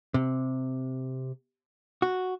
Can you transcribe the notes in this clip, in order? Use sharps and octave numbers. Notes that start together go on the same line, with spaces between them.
C3
F#4